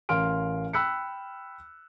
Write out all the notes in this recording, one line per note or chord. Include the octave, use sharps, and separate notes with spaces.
A1 A#4 F5 C6 F6 D7
G5 B5 E6 F#6 B6 C#7